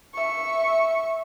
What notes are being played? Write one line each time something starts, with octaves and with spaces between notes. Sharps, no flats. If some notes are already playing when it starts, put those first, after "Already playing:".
E5 C#6